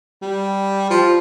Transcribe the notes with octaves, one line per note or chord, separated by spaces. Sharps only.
G3
F3